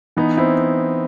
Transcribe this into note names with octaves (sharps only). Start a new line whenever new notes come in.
E3 B3 D#4
C4 E4